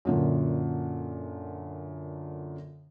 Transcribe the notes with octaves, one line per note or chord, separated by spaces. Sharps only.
F#2 A#2 D3